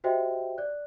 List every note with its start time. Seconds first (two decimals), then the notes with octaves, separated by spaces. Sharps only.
0.04 F#4 G4 C5 D#5 E5 G5
0.58 D5 F#6